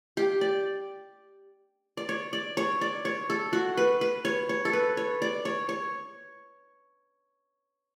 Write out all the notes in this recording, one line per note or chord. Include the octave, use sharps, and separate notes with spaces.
G4
D5
D5
C#5
D5
C#5
D5
C#5
A4
F#4
B4
B4
C#5
C#5
A4
B4
C#5
D5
C#5
C#5